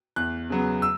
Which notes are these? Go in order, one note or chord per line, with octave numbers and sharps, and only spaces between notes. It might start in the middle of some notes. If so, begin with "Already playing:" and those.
E2 F#6
C#3 F#3 B3
E6